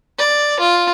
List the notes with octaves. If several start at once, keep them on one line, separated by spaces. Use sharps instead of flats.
D5
F4